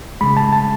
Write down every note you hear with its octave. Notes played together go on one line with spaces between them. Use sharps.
C#3 G#3 B5
A5
A5